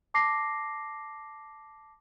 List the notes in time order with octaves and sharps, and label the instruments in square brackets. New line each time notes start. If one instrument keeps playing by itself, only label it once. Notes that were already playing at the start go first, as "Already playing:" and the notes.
[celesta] A5 D6 A#6 C7